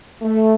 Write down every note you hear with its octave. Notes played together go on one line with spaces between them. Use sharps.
A3